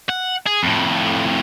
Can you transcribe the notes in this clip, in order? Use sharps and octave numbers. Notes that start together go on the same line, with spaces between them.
F#5
G#4
F2 A2